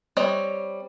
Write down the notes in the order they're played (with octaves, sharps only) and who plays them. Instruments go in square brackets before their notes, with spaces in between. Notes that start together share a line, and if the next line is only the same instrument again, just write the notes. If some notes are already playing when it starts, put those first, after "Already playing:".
[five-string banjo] G3 C4 C#5 D#5